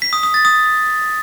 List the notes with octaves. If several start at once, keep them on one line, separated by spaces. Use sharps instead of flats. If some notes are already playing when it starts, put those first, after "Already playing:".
B6
D#6
D#6
A6
D#6